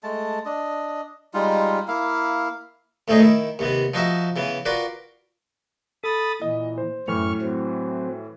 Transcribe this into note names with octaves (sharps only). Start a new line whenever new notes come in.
G#3 A3 A5
D4 D#5
G3 G#3 D#4 F4
A#3 E4 F5
D2 A2 A3 D#4 G#4 D#5
D#3 E4
D#2 C3 B3
F3 D#4 F#4 D#5 E5
C#3 E3 B3
F4 F#4 A#4 B4 D5
A4 B5 D#6 A6
A#2 E3 D#5
C5
F#2 A2 E3 C#6 F6
F#3 C4